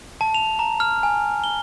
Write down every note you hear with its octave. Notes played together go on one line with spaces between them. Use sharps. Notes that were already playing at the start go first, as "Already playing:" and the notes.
A5
F7
A#5
F6
G#5
G7